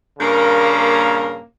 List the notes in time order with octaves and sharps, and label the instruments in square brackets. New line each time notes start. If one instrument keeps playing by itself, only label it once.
[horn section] G2 A#2 C#3 A#3